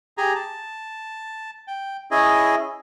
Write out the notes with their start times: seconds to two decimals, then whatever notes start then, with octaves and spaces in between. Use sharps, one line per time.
0.18 G4 G#4 G#5 A#5
0.35 A5
1.68 G5
2.11 C#4 E4 G#4 D#5